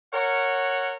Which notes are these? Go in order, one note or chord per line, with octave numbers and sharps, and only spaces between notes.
A#4 C#5 F#5